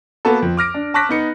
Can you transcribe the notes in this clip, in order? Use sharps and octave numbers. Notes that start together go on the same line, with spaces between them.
A#3 B3 F#4 A4
F2
D6 F6 A#6 D7
D4
A5 C#6 D6 F#6 A#6 B6
B3 D#4 C#7